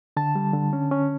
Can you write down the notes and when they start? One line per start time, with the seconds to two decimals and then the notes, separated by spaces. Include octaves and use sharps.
0.17 D3 A5
0.35 G3
0.53 D3
0.73 C#4
0.91 C#4